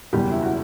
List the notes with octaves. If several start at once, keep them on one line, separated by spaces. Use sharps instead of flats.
F#1 E2 B2 G3 G4
E4
F#4